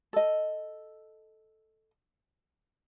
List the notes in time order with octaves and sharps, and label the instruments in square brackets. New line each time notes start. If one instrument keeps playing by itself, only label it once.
[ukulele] A4 D#5